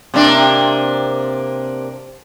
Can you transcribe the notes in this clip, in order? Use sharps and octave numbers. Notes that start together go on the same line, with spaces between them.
C3 A#3 D4